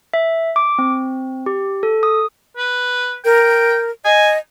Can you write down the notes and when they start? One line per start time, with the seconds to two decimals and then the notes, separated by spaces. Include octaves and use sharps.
0.14 E5
0.56 D6
0.78 C4
1.46 G4
1.83 A4
2.03 D#6
2.57 B4
3.25 A#4 G5
4.05 D#5 G#5